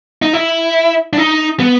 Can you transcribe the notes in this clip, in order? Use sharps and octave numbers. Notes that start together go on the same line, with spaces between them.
D#4
E4
D4
D#4
B3